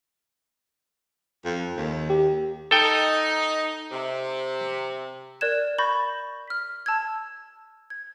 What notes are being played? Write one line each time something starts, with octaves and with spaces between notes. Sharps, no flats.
F2
D#2
G4
D#4 A4 G5
C3
A#4 D5 F#6 G#6 E7
B5 C#6 G6 A6 A#6
F6 B6
A5 E6 F6 G#6
G#6